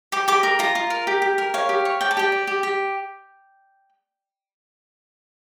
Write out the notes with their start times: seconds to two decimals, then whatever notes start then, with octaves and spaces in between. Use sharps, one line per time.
0.12 G4 D6
0.28 G4 D6
0.43 A#4
0.59 F4 A#5
0.75 F4
0.90 A#4
1.07 G4
1.22 G4
1.38 A#4
1.54 C#5 F5
1.69 G4
1.85 C#5
2.01 D5 G5
2.11 A5
2.17 G4 G5
2.32 D5
2.47 G4
2.63 G4